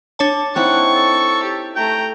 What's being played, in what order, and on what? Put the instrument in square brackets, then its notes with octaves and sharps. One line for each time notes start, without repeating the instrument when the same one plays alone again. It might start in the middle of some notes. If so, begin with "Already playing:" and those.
[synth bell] D4 C#5 A5
[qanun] C4 D#4 E4 [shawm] F#5 [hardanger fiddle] C#6
[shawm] A4
[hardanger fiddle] G4
[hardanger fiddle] A3 A#5 [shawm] G5